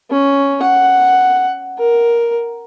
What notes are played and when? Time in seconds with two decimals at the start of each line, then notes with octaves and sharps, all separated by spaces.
0.10 C#4
0.62 F#5
1.78 A#4